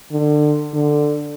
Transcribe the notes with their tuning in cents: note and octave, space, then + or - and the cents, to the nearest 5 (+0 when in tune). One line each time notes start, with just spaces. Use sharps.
D3 +25
D3 +10